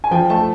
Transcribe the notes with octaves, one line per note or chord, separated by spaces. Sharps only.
G#5
F3 G5
A3 A5